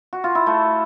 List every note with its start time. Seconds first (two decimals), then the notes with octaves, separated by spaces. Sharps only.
0.13 F#4
0.24 F4
0.35 E4
0.46 A3